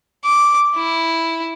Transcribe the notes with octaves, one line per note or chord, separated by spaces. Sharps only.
D6
E4